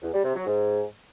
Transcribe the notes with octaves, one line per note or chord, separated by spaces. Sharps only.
E2
G3
C3
F#3
G#2